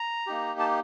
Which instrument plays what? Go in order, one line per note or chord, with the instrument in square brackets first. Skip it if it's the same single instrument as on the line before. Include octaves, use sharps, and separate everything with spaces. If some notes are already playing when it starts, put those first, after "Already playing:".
Already playing: [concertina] A#5
A#3 D#4 G4
A5